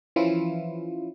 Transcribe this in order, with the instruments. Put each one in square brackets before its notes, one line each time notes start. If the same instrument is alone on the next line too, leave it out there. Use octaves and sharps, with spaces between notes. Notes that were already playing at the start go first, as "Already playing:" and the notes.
[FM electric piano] E3 F3 C#4 E4 F4